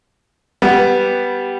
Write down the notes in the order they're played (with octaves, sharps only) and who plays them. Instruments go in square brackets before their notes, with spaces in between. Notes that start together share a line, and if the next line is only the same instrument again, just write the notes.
[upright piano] G3 B3